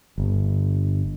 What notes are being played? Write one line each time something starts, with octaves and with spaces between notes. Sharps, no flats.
G1